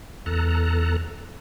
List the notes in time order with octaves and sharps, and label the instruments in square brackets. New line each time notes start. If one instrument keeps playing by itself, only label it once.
[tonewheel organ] E2 A4 A#5 F#6